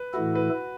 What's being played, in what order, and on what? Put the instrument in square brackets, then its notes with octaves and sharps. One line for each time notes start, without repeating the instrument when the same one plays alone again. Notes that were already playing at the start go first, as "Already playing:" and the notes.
Already playing: [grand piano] B4
[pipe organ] A2 E3 A3 E4 A4 [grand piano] F#4
[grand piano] B4